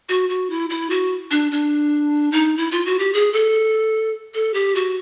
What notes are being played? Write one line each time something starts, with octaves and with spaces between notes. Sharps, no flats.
F#4
F#4
E4
E4
F#4
D4
D4
D#4
E4
F4
F#4
G4
G#4
A4
A4
G4
F#4